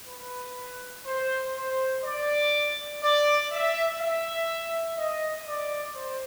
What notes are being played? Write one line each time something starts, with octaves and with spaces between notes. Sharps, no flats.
B4
C5
C5
D5
D5
E5
E5
D#5
D5
C5